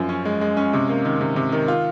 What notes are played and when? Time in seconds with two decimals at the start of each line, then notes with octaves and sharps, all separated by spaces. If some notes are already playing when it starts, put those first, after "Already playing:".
Already playing: F#2 F3
0.09 C#4
0.25 G#3
0.41 G#3
0.57 C#4
0.73 C3
0.89 A#3
1.05 D#3
1.21 C3
1.36 C3
1.52 D#3
1.68 F4